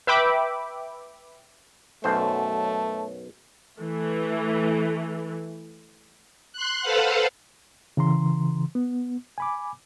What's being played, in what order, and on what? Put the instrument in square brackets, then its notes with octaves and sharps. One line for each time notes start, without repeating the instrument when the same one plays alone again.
[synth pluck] B4 E5 G5 B5 D6
[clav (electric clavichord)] B1 F#2 C5 [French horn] A3 [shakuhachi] A5
[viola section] E3 A3
[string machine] C6 F#6
A4 B4 C5 F5 F#5
[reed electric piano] C#3 E3 A#5 C6
B3
G#5 B5 D6